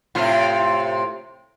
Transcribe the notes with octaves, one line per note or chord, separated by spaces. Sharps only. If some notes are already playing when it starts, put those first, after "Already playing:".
A2 C3 F4